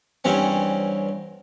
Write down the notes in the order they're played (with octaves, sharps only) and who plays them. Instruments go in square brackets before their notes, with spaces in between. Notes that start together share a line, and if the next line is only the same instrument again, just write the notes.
[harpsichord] E2 G2 C4 C#4